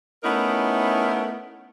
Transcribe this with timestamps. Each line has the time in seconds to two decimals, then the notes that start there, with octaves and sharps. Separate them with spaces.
0.24 A3 B3 C#4 D#4 E4 A#4